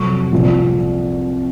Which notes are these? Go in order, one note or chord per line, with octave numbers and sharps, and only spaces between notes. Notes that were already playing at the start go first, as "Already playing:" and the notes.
Already playing: F2 C3 F#3 C#6
C2 A#2 F3 C4